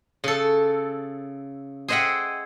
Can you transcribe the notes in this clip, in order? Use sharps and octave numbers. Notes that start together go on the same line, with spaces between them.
C#3 A4
G#4 C5 D#5 E5 F#5 G5